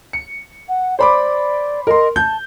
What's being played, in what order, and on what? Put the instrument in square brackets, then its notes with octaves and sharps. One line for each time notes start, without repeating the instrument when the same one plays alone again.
[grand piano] C#7
[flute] F#5
[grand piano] C5 B5 D6 [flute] D5
[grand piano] A#4 C6 [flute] D#5
[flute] A5 [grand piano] G6